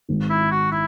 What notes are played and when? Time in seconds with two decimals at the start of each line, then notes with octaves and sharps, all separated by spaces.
0.09 G#1 G#2 D#3
0.30 E4
0.51 F#4
0.72 E4